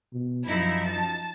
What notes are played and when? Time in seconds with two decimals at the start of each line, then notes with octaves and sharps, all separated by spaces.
0.13 B2
0.47 F#2 F3 D#4 E4
0.85 A5